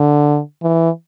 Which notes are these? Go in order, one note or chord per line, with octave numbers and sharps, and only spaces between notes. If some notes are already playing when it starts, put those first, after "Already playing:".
Already playing: D3
E3